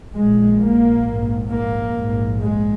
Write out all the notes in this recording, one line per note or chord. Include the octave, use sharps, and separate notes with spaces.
A#1 A#2 G#3
A#3
A#1 G#2
A#3
A#1 G#2
G#3